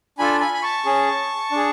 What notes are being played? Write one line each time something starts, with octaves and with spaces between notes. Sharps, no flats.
D4 F4 A4 G#5 B5
G#5 B5
B5
A5 C#6
C#4 G#4
D4 G#4